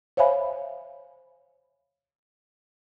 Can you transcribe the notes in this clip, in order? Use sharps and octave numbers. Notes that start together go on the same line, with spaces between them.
C5 C#5 E5 F5 G#5 B5